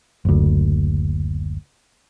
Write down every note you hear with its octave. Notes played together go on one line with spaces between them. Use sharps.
F#1 D2